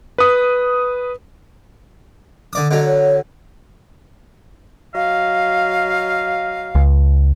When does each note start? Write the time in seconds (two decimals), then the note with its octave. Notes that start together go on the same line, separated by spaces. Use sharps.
0.18 B4 D#6
2.53 D3 D5 D#6
2.71 D3 F#3 D#5
2.85 C#5
4.94 F#3 D#5 F5
6.75 C#2